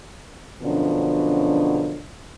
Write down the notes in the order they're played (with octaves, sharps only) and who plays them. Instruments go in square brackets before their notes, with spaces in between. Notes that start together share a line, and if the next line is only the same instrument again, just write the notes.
[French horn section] F#2 B2 D3 F3 C#4 D4